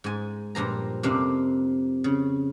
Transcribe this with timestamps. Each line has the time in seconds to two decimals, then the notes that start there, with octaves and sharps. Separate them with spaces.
0.04 G#2 G#5
0.55 G2 A#2 F3 A#5
1.03 F2 C3 A#3 D4 F5
2.04 C#3